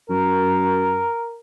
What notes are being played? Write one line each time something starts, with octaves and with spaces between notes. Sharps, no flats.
F#2 A#4